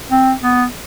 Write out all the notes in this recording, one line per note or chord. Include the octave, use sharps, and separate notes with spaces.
C4
B3